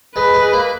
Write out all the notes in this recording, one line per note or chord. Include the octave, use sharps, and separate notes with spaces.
G#3 B4
G#3
A#3